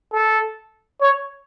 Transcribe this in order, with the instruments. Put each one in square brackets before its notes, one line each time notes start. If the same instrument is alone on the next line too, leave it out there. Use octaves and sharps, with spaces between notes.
[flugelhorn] A4
C#5